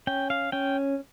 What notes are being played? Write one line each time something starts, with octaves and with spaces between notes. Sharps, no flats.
C#4 G5
F5
C#4 G5